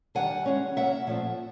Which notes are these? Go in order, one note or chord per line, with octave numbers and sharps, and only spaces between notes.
D#3 G3 A#3 D4 F#5 G#5
E3 G#3 C#4
F#3 A#3 C#4 E5 F#5
A#2 F3 A3 C4